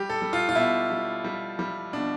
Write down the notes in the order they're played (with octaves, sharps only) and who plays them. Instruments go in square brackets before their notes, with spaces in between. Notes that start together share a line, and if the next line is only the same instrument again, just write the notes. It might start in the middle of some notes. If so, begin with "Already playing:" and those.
Already playing: [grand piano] G3 G4
A4
G3
F4
F4
B2 E4
G3
G3
G3
B2 D4